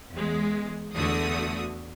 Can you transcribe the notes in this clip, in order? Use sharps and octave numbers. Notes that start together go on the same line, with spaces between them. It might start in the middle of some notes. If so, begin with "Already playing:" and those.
E2 G#3
E2 D3 A3 F#4 D#6